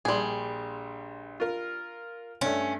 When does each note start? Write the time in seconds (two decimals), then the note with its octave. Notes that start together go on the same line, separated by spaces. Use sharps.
0.05 A#1 G3 G#4 C6
1.40 F4 A#4
2.41 G2 A3 C#4